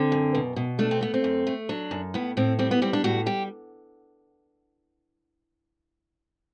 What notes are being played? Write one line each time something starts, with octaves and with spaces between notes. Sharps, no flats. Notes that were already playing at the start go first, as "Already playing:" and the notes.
Already playing: D3 C4
F#2
B2
B2
A3 D4
C4
A3 B3
C4
F#2
A3
F#3 D4
F#2
A2 B3
A2 C4
G3 C4
B3
G3 C4
D4
A2 F#4
G3 G4